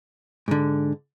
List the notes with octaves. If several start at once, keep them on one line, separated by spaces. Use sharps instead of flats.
G#2 D3